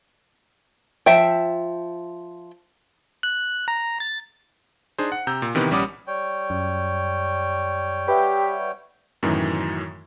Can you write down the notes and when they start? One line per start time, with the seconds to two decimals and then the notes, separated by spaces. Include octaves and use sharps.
1.06 F3 E5 G5
3.23 F#6
3.68 A#5
4.00 A6
4.98 D4 D#4 G#4 C5
5.12 F#5
5.27 C3 A#5 E6 G6
5.42 A#2
5.55 C3 D#3 E3 B3
5.71 A#1 G3 C#4 F#5 D6 D#6
6.07 G3 C#5 G5
6.50 F#2
8.08 G4 B4 E5 F#5
9.23 F#2 A2 D#3 E3 F#3